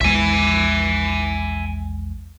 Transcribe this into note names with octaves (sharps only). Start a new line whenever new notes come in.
A#1 E2 G#3 E5 G#5